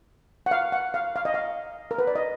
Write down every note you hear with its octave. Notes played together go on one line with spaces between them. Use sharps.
F#5
F5
F#5
F5
F5
D#5
F5
A#4
B4
D5
D#5